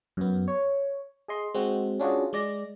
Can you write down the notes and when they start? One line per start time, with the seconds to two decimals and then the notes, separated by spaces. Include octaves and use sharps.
0.17 F#2 B3
0.48 C#5
1.28 G#4 D#5 C6
1.54 G#3 C4 F#4
2.00 C#4 D4 F4 F#4 G#4
2.33 G#3 D5 A#6